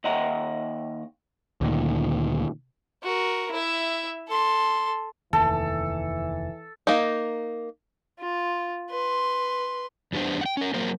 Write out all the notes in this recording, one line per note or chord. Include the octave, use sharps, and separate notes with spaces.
D#2 D#5 E5 F#5 G5 A#5
D2 A#2 D#3
F#4 A#4
E4 E5
A4 C6
F1 D#2 E3 A4 A5
A#3 D#4
F4
B4 C6
E2 G3 B3 D4 C5
F#5 G5
C#4 A#4
F#3 A#3 C4 A#4 C5